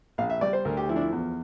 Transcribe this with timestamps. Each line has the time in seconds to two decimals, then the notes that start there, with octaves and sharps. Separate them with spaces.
0.18 A#1 F5
0.30 E5
0.41 G3 D5
0.53 C5
0.65 D2 A#4
0.77 G4
0.89 F3 E4
0.96 D4
1.01 E4
1.12 E2